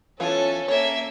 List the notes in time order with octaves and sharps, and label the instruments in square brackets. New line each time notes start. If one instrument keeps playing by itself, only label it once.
[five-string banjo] E3 B3 F4 [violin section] C#4 A4 [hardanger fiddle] G#5 A5
[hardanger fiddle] A#3 E5 [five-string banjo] C#5